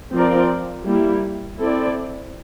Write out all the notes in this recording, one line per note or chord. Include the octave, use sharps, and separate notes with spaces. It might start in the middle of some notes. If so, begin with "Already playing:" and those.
F3 C4 F4 A#4 D5
G3 A#3 E4
C4 E4 A4 D5